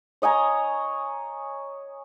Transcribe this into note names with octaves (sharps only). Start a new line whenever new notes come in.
C#5 D#5 G#5 A#5